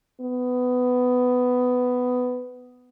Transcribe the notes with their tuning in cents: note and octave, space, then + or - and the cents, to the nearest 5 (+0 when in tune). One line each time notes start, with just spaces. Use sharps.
B3 +15